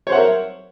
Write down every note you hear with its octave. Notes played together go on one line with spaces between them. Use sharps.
A#4 C5 C#5 E5 F#5